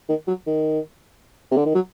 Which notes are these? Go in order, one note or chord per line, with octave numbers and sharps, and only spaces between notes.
D#3
F#3
D#3
C3
D3
D#3
F#3